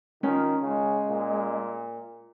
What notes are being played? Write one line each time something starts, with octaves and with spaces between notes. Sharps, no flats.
D#3 C#4 F4
C#3 G#3
A#2